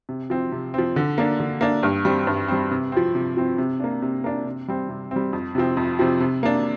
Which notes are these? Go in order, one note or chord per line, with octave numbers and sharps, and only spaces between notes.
C3
F3 C4
C3
F3 C4
D3
A#3 D4
D3
A#3 D4
G2
G3 C4
G2
G3 C4
C3
F3 C4
C3
F3 C4
C3
A#3 D4
C3
A#3 D4
C3
G3 C4
C3
G3 C4
F2
C3 F3 C4
F2
C3 F3 C4
C3
A#3 D4